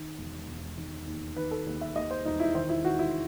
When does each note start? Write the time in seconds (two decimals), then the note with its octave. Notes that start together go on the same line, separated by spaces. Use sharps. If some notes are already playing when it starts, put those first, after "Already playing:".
Already playing: D#3
0.18 E1
0.48 E1
0.77 D#3
1.07 D#2
1.36 D#3 B4
1.51 A4
1.66 D#2
1.81 E5
1.96 D#2 D#5
2.11 C5
2.25 E1 D#4
2.40 E4
2.55 D#3 C5
2.69 E4
2.84 D#3 F#4
2.99 E4